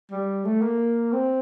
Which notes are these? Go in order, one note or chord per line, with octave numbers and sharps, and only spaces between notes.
G3
A3
A#3
C4